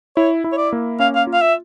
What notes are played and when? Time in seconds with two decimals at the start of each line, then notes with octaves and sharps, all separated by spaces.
0.17 E4 C#5
0.44 E4
0.52 C#5
0.57 D5
0.73 A#3
1.00 C#4 F5
1.15 F5
1.27 F4
1.34 F5
1.41 E5